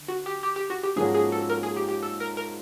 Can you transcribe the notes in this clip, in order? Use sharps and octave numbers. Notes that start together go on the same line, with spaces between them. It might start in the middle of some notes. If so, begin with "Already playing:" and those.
Already playing: D3
F#4
G4
G4
G4
F#4
G4
G#2 F3 A#3 C#4 F#4 G#4
G#4
A4
A#4
G#4
G4
G4
A4
A#4
A#4